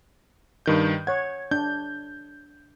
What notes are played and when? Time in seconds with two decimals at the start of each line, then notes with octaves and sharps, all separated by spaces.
0.66 G2 D#3 G6
1.07 C#5 F#5 G#6
1.51 D4 G6